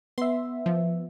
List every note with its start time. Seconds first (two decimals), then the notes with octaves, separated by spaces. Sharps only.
0.18 B3 E5 C6
0.66 F3